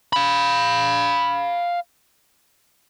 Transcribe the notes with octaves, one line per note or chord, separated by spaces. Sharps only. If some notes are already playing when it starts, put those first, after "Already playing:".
F5 B5